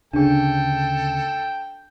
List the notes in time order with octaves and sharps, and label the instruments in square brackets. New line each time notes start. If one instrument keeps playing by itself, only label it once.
[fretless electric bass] D2 C#3 [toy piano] D4 G#4 [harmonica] A4 [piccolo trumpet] G5